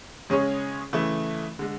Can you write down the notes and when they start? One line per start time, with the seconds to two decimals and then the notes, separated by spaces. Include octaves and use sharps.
0.30 C#3 G#3 C#4 G#4 C#5
0.93 C#3 E3 A3
1.59 D3 G#3